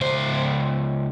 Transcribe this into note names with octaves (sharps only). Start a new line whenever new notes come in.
C#2 C5